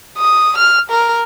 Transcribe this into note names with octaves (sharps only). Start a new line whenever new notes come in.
D#6
F6
A#4